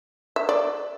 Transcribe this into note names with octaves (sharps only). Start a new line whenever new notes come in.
E5
D5